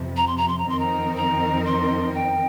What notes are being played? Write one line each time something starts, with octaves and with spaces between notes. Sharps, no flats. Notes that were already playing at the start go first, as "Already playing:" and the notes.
Already playing: F2 C3 F3
A#5
C6
A#5
C6
A#5
F2 D#3 C4 D#4 A#4 C6
A#5
A#5
C6
G5